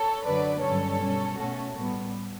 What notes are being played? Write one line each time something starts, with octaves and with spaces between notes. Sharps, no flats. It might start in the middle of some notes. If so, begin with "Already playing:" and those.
Already playing: A4 C#5
F#2 D3 F#3 B4 D5
G2 D3 F#3 C#4 A4 C#5
B2 G3 C#4
B2 A3 C#4 F#4 A4
A2 G3 B3